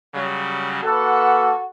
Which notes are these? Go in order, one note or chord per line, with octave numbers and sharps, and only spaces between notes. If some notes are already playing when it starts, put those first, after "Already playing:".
C#3 F#3 G3
A#3 F#4 A4 B4 F#5